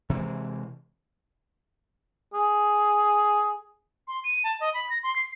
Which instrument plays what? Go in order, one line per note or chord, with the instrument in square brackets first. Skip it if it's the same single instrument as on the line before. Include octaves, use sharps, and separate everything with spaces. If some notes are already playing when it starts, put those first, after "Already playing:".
[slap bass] C3 E3 F3 G#3
[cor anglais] G#4
[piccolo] C6
D#7
A5
D#5
B5
A#6
C6
C7